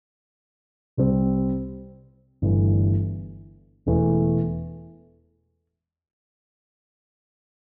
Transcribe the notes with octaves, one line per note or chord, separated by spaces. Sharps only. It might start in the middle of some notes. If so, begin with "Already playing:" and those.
C2 C3 G3 C4
G1 G2 E3 A3
E1 E2 E3 A3